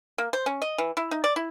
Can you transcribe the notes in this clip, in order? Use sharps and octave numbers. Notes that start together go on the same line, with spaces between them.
A#3
C5
C#4
D#5
E3
E4
D#4
D5
E4